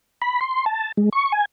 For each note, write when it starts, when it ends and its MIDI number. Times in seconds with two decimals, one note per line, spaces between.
0.22 0.39 83
0.41 0.65 84
0.66 0.92 81
0.97 1.09 56
1.13 1.32 85
1.32 1.45 80